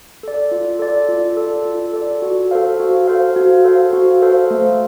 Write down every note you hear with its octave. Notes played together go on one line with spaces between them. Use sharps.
A4 D5
F4
A4 D5
F4
A4 D5
F4
A4 D5
F#4
A4 C5 F5
F#4
A4 C5 F5
F#4
A4 C5 F5
F#4
A4 C5 F5
A3